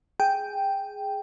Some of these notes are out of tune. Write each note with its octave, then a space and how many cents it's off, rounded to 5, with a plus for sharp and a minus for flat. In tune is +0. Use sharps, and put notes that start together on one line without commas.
G#4 +0 G5 +0